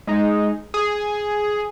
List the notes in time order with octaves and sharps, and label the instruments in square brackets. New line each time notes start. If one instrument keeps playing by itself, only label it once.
[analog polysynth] G#3 D#4
G#4